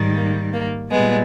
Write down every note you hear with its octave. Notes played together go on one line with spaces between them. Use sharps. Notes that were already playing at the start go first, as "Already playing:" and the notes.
Already playing: G#2 D#3 G3
A#3
A#3
A#2 G3 G#3 B3